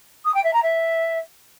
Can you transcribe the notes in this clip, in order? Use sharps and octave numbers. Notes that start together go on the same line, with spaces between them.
D#6
G5
E5
A#5
E5